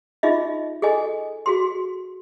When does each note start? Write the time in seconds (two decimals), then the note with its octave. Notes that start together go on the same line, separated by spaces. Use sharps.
0.23 D#4 F4 G#4 D#5 E5
0.82 G#4 A4 D#5 G#5
1.46 F#4 G#4 C6